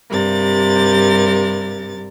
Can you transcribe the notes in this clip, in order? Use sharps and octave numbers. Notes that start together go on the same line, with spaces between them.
G2 C3 A#4 A6